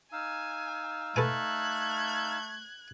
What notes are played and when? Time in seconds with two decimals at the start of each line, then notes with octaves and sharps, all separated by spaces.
0.12 D#4 F5 G#5 E6
1.16 A3 A4 B4 G#5 F#6 G#6